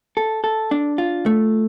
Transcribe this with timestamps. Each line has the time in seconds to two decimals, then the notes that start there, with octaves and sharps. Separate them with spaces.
0.17 A4
0.44 A4
0.71 D4
0.98 F4
1.26 A3